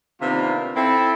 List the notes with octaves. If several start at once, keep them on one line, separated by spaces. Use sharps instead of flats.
C3 D#3 A#3 B3 D4 F4
C4 E4 A4